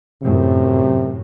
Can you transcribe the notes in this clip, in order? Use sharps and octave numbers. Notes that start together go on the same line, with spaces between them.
F#2 A2 C3